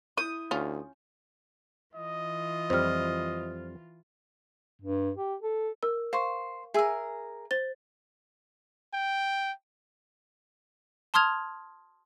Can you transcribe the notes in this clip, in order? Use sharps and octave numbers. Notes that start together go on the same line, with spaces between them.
E4 D#6 G6
D2 C#4 F4
E3 F4 D#5
F2 G3 C5 F6
G2
G4
A4
A#4 E6
C5 F5 C#6
G#4 A#4 E5 G#5 E6
C5 A6 G7
G5
A5 C6 D#6 F6 G#6 F7